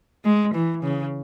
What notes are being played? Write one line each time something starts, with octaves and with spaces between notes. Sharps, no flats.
G#3
E3
C#3